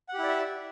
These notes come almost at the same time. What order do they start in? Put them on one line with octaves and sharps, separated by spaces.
F#5 G4 E4 D5 E5